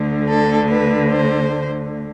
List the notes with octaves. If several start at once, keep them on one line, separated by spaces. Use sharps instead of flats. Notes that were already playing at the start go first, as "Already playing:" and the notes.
Already playing: D2 D3 A3
A4
B4
C5